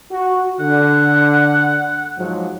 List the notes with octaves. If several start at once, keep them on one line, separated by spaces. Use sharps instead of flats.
F#4
D3 F#5
G#2 F3 F#3